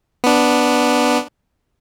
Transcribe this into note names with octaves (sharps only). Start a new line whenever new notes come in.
B3 D4